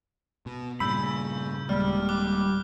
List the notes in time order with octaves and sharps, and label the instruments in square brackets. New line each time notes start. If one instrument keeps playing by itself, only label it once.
[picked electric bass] B2
[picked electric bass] G2 A#2 [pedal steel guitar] C#3 B5 [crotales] E6 G6
[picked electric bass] D#1 G#3 A#3 [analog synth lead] G3 [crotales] F6
[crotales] D6 F#6 G7